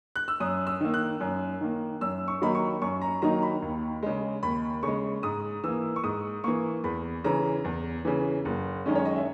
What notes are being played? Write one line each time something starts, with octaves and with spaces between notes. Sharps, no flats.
F#6
E6
F#2 D#6
E6
D#3 A#3
F#6
F#2
D#3 A#3
F#2 E6
C#6
D#3 F#3 A#3 D#4 B5
C#6
F#2 C#6
A#5
D#3 F#3 A#3 D#4 A#5
B5
D#2
C#3 G#3
D#2 B5
C#3 G#3 C#6
G#2 D#6
E3 A#3 E6
C#6
G#2 D#6
E3 A#3 C#6
E2 B5
C#3 E3 A#5
E2
C#3 E3
F#1
F#2 D#3 G#3 C#4
C#5
D#5
E5